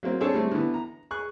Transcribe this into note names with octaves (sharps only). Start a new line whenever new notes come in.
F#3 A#3 C4
C4 D4 G#4 A4 C#5
G3 A3 C4
D3 E3 B3
A#5
G#4 C#6 F#6